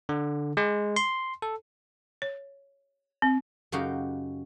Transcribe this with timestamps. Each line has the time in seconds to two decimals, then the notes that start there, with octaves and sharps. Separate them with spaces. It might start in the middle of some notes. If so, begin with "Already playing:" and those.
0.09 D3
0.57 G#3
0.96 C6
1.42 A4
2.22 C#5
3.22 C4
3.72 F#2 C#3 D#4 F#4 G4 F5